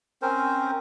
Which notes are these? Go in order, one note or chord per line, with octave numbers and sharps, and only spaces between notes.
C4 C#4 A#4 C5